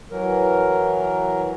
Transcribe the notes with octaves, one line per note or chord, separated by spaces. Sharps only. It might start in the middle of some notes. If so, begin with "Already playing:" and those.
E3 F#3 A#4